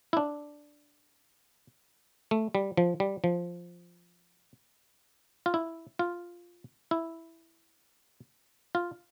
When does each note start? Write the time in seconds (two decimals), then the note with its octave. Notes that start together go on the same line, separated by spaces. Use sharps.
0.13 E4
0.17 D4
2.31 A3
2.55 G3
2.77 F3
3.00 G3
3.24 F3
5.46 F4
5.54 E4
5.99 F4
6.91 E4
8.75 F4